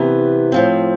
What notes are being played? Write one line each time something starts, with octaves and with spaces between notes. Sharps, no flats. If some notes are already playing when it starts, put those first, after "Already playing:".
Already playing: C3 E3 B3
A2 F3 C4